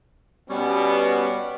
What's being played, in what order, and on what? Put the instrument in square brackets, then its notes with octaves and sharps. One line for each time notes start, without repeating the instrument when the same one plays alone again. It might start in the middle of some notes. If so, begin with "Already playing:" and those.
[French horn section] B2 B3 [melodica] G3 C#4